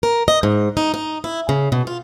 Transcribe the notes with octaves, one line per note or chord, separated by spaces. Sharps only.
A#4
D#5
G#2
D#4
D#4
E4
C#3
B2
F4